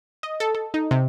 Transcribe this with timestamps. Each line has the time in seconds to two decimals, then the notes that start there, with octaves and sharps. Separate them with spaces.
0.23 D#5
0.40 A4
0.55 A4
0.74 D#4
0.91 C3